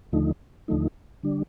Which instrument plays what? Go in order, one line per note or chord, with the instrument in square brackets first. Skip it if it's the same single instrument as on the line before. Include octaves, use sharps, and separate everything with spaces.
[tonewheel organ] D#2 D3 F3 A3 D#4
D#2 D3 F3 A3 D#4
D3 G3 D4